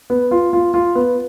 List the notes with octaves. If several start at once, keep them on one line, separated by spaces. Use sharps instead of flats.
B3
F4
F4
F4
B3